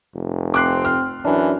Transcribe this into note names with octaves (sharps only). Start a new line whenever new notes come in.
F1
C4 D6 F#6 C7
F6
F#2 E3 D4